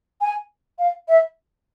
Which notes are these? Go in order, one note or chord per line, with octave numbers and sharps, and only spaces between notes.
G#5
F5
E5